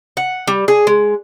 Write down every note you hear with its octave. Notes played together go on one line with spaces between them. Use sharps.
F#5
G3
G#4
G#3